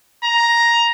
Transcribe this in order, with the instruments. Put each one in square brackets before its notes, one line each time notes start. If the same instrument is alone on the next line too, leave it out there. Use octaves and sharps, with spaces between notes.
[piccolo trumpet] A#5